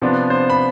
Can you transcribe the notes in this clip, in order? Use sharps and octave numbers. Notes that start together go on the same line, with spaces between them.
C3 F3 B3 D4
C5
B5